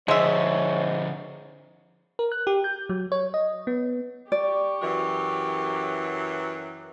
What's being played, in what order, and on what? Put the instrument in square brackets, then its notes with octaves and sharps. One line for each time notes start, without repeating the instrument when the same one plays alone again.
[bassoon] G#2 [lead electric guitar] D3 F3 [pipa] G#3 E5 [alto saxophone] C#5
[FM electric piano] A#4
F#6
G4
G6
F#3
C#5
D#5
B3
[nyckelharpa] G4 C#6 [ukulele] D5
[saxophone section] F#2 E3 F#3